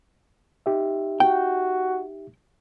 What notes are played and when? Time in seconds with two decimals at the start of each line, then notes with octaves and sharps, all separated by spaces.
0.66 D#4 G4 E5
1.20 F#4 G5